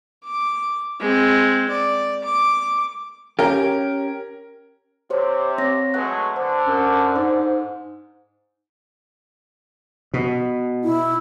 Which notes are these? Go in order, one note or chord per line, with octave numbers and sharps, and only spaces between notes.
D6
G#3 C4
D5
D6
C#4 G4 A#4
C3 G4 C5 C#5
C4 C#5 A#6
F#3 G#3 A3 B4 F#5 F#6
D3 C5
F#2
G#2 C5
B2
E4